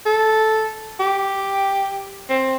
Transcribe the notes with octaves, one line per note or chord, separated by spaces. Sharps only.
A4
G4
C4